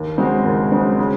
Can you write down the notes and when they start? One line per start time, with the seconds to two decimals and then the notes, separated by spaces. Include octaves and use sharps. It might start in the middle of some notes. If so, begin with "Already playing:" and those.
Already playing: D#2
0.18 C#3 G#3 C4 F#4
0.45 D#2
0.72 C#3 G#3 C4 F#4
0.99 C#3